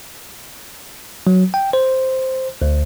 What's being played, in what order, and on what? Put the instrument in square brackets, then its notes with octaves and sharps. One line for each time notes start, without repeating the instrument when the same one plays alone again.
[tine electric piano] F#3
G5
C5
D2